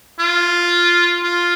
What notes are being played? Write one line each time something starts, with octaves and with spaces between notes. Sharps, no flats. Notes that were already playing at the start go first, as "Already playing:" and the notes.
F4
F4